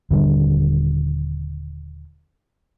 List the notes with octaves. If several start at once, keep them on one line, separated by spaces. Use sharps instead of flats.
D#1 D3 G3 D4